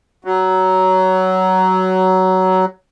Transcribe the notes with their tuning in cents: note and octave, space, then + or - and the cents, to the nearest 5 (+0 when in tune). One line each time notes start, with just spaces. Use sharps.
F#3 +15